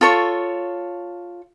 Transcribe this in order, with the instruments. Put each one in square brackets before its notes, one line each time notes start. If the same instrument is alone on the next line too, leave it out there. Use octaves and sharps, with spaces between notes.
[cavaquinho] F4 A4 C#5 C#6